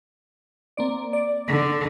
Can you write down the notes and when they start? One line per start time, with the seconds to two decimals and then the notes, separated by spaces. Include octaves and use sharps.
0.77 A#3 C4 D5
1.13 D5
1.47 D3